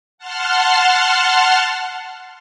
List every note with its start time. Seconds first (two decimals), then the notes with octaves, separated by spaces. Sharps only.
0.18 F#5 A5 C6 F6